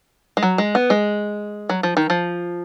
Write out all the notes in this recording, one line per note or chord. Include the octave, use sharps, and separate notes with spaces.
G#3
F#3
G#3
B3
G#3
F#3
F3
D#3
F3